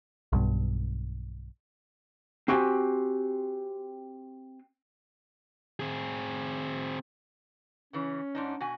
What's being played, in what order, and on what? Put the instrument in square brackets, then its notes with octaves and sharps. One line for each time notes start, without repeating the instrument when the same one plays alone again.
[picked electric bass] B1 G2
[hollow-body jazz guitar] C4 F#4 G4 G#5
[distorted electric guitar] C4 G#4
[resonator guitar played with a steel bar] C#3 E3 [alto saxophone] C#4
[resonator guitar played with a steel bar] G#2 D4 D#4
B2 F#4 G#5